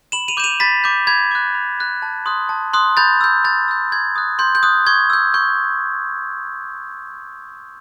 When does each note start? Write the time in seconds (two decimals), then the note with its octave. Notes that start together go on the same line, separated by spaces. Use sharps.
0.12 B5 E7 F#7
0.28 D#7 F7
0.37 D6 G6 E7
0.44 D#7 F7
0.60 B5 A6 B6
0.84 D6 G6
1.07 B5 G#6
1.31 D6 F#6
1.54 B5
1.79 D6 F#6
2.02 A5
2.26 C6 D#6 F#6
2.49 A5
2.73 C6 D#6 F#6
2.97 B5 G6 A6
3.21 E6 G6
3.44 B5 G6 A6
3.68 E6 G6
3.92 C6 G#6
4.16 D#6 F#6
4.39 C6 G6
4.55 G6
4.63 D#6 F#6
4.87 C#6 G#6
5.10 E6 G6
5.34 C#6 G6